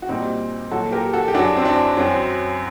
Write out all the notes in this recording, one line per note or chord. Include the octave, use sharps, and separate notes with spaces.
F#4
A#2 G3 C4 D#4
A#2 F#3 F#4 A4
G4 A#4
F#4 A4
G4
F#2 F#3 D4 F#4
C4
D4
F#2 F#3 C4